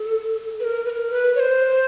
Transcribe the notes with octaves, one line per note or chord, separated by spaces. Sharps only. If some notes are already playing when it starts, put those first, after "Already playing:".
Already playing: A4
B4
A#4
B4
A#4
B4
C#5
C5